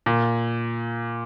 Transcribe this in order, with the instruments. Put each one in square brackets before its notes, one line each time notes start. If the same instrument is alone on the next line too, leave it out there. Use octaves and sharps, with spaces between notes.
[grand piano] A#2